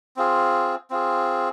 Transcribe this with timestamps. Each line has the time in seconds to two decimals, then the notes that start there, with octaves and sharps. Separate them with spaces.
0.16 C4 F4 G#4
0.90 C4 F4 G#4